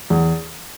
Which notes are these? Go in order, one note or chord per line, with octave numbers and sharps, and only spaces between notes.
E2